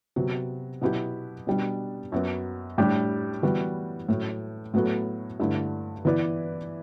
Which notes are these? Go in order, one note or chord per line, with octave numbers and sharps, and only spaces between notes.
C3 F#3 B3
B2 F#3 B3 E4 G4
B2 G3 D4
F#2 F#3 B3
A2 G3 D4 G4
E3 G3 B3 F#4
A2 F#3 A3
A2 F#3 B3 F#4 A4
G2 D3 A3 E4
E3 B3 E4 B4 D5